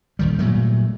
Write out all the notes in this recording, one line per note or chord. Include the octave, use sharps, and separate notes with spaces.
D#1 D#3 G3
A#2 F#3 G3 A3